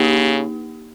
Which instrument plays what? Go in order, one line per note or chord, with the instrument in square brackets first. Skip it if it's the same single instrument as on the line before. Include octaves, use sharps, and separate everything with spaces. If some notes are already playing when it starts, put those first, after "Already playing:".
Already playing: [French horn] C#3 [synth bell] A#3 D#4 G4